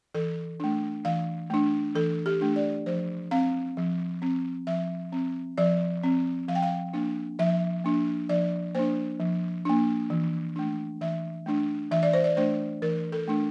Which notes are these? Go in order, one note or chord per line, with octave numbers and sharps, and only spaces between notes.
E3 A4
A3 D4
E3 F5
A3 D4
E3 A4
G4
A3 D4
D5
F3 C5
C4 F5
F3
C4
F3 E5
C4
F3 D5
C4
F3 F5
G5
F5
A#3 D4
F3 E5
A#3 D4
F3 D5
A#3 D4 C5
F3
A#3 D4
E3
A3 D4
E3 E5
A3 D4
E3 E5
D5
C5
D5
A3 D4 C5
E3 A#4
A4
A3 D4